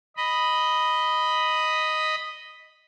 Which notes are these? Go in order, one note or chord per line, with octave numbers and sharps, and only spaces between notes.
D#5 B5